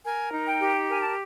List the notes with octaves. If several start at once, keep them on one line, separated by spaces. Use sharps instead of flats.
A#4 G#5
D#4
G5
G4
A#4 G#5
A5